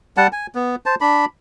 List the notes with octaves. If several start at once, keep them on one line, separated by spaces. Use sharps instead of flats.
G3 F#5 A5
G#5
B3
C5 A5
D4 B5